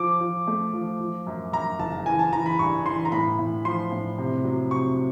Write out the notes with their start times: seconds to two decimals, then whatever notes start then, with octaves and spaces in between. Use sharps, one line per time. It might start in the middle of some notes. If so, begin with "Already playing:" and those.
Already playing: F3 D6
0.20 F3
0.47 A3
0.73 F3
1.00 F3
1.27 F#2
1.53 F#2 A#5
1.79 F#1 A5
2.06 E3 G#5
2.19 A5
2.32 E3 A#5
2.46 B5
2.59 G2 C#6
2.86 E3 C6
3.05 A#5
3.12 A2 B5
3.39 A2
3.65 F3 C6
3.92 A2
4.18 C3
4.45 F#3
4.71 C3 C#6